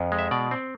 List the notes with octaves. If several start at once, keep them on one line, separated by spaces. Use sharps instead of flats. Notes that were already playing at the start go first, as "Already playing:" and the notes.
Already playing: F2
G#3
E5
B2 D5
C4